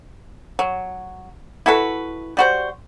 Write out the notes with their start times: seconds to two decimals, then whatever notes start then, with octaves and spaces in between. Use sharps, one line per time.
0.59 F#3
1.66 E4 F#4 A4 B4
2.37 G3 F#4 C5